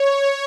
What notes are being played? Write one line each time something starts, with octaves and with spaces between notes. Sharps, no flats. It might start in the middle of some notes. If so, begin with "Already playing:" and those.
Already playing: C#5